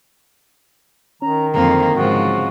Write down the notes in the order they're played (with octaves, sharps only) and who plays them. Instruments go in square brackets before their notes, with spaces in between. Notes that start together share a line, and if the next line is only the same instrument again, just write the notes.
[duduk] D#3 [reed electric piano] C#4 [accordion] A#5
[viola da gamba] F2 A#3 [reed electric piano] D3 F#3 C4 [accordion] A#5
[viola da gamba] G#2 F3 [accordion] C#3 F#4